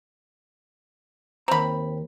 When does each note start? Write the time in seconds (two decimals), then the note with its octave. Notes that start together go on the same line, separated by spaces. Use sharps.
1.48 D#2 C4 A#5 B5